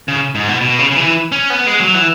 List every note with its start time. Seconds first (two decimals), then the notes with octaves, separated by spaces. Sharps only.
0.08 C#3
0.35 G#2
0.48 B2
0.61 B2
0.79 C#3
0.91 C#3
0.97 E3
1.32 C#4
1.50 B3
1.67 G#3
1.80 F#3
1.94 E3